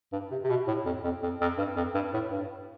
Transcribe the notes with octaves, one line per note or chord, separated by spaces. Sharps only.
G2
C3
C3
B2
A2
F2
F2
F2
F2
G2
F2
G2
A2
G2